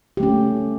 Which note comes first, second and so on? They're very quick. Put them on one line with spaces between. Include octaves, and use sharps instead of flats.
G4 A3 C#4